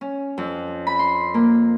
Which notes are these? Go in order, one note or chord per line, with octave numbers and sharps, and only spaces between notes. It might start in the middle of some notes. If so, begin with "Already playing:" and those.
C#4
F2
B5
C6
A#3